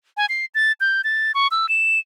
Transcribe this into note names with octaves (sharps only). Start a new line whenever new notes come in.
G#5
C7
A6
G6
A6
C#6
E6
E7